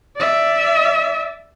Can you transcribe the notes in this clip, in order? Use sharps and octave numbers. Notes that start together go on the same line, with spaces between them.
D5 E5